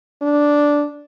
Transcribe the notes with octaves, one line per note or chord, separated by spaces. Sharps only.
D4